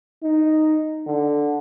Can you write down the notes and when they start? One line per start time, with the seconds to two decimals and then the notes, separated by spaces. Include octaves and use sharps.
0.23 D#4
1.07 D3